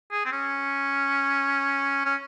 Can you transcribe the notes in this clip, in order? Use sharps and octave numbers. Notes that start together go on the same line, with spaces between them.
G#4
C4
C#4
C#4